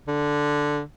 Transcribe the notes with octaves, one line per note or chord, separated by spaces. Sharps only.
D3